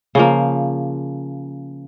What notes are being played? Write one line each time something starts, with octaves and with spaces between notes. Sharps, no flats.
C#3 F3 A#3